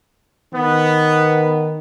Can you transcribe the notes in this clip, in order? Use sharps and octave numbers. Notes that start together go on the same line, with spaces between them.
D#3 B3